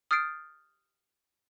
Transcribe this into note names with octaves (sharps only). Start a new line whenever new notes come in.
D#6 F6 G6 A6 C7 D7